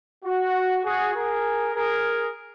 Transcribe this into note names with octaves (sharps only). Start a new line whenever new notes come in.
F#4
F#4 G#4
G#4 A#4
G#4 A#4